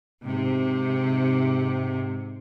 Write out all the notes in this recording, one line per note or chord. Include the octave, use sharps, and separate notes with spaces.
G#2 C3